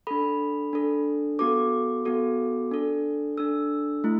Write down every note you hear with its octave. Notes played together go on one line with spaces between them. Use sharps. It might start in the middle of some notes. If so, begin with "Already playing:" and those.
D4 A4 B5
D4 A4
B3 F#4 A4 D6
B3 F#4 A4
D4 A4
D4 A4 E6
A3 E4